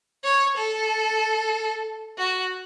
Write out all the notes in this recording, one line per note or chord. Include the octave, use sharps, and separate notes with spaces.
C#5
A4
F#4